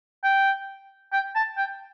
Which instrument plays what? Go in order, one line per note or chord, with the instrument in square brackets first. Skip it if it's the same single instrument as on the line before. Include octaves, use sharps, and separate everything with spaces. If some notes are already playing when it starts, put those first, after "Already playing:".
[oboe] G5
G5
A5
G5